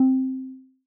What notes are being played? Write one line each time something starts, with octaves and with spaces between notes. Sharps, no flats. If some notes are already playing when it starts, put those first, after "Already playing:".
Already playing: C4